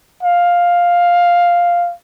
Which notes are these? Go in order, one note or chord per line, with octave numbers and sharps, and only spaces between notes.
F5